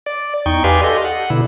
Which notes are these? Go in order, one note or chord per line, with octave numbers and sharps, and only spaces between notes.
D5
E2 D#4 G5 C#6
G4 B4 D5 F5 G#5 C6
G4 A4 D#5 C6
F#5
B2 D3 E4